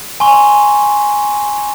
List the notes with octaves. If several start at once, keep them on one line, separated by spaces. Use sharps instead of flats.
G#5 C6 C#6